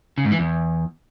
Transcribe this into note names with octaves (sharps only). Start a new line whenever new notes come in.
C#3
G#2
E3
E2